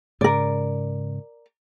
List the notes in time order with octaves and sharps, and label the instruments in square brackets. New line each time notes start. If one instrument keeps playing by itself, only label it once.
[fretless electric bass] G#2 C#3 [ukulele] A#4 D5